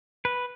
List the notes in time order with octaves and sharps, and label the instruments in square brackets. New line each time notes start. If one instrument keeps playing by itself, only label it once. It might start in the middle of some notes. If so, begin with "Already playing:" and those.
[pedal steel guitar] B4